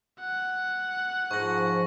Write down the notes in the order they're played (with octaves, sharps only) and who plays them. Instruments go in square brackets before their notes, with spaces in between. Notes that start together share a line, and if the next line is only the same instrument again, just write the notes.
[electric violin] F#5
[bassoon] G#2 [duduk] F3 [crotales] C#6 A#6